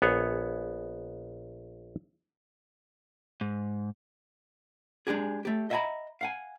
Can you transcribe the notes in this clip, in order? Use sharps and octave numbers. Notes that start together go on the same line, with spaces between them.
A#1 B3 G#4 C#5
G#2
G#3 D4 G4 G#4
A3 G4
D#5 E5 F#5 G#5 A#5 B5
F5 F#5 G#5